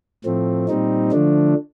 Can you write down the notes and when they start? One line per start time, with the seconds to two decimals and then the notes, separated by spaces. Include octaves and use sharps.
0.25 A2 F3 A3 C4
0.68 A#2 G3 C4 D#4
1.11 D3 F3 A3 D4